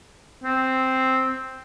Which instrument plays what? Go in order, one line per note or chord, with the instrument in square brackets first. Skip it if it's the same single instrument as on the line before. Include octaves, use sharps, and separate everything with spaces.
[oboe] C4